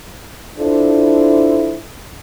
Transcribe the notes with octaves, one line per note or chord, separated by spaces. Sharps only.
D4 E4 F4 A4 C5